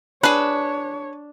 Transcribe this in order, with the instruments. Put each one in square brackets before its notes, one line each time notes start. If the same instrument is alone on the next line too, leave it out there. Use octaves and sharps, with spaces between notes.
[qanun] D4 [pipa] G#4 B4 [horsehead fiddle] C#5